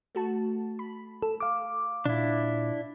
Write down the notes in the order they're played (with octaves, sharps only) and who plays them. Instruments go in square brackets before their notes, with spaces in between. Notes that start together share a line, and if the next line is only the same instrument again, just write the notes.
[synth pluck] A3 F#4 A5
B5
[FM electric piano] A4
F5 D6
[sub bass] A#2 [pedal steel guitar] D4 E4